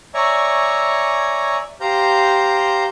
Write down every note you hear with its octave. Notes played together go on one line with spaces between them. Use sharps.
C#5 D5 E5 G#5 A#5 C#6
G4 C5 F5 A#5 G6